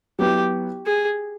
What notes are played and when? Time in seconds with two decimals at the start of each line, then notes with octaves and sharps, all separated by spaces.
0.19 F#3 B3 E4 G4
0.86 G#4